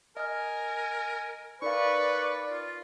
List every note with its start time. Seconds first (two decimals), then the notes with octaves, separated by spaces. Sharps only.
0.17 A#4 D#5 G#5 F6
1.62 D#4 A#4 B4 D5 F5 C#6
2.51 F4